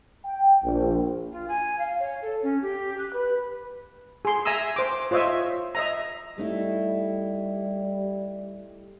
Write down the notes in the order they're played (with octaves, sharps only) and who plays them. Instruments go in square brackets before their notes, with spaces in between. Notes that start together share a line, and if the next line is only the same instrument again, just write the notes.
[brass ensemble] G5
A#1
[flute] F4
G#5
F5
C#5
A4
C#4
G4
F#6
B4
[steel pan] G#4 C6
E5 G#5 A#5 D#6 E6
C5 D6
F4 C5 C#5 D#5 E5
D#5 E5 A#5
[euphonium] G3 [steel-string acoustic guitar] A3 D#4 E4